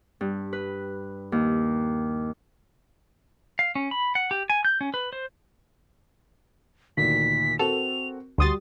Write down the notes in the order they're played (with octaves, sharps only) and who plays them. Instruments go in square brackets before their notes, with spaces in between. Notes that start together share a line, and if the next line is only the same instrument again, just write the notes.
[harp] G2
B4
D#2
[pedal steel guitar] F5
C#4
B5
F#5
G4
G#5
G6
C#4
B4
C5
[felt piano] D2 A#2 D#3 [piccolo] B6
[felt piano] C4 F#4 A#4 [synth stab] A4 [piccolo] F7
[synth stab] D2 D#6 A6 [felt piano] G3 F#4 [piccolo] C6